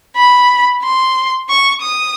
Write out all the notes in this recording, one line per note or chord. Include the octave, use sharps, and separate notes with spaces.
B5
C6
C#6
D#6